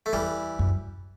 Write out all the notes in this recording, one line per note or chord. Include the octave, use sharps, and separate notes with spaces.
A3
E2 E3 G3
F#2